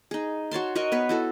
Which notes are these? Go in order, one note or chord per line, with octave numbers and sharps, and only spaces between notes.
D#4 G#4
F#4 C#5 A5 C6
F#4 A#4 D#5 C#6
B3 B4 C#5
E4 F#4 A4